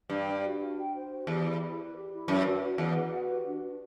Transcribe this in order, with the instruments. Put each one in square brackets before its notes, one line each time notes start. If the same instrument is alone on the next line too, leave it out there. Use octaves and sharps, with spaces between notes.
[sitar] G2 [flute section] G5
[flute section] C5
F#4
F#4
G5
C5
F#4
[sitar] E2 [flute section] G4
[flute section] E4
E4
B4
G4
E4
[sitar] F#2 [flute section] B4
[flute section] F#4
F#4
[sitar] E2 [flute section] F#5
[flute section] B4
F#4
G4
D4
D4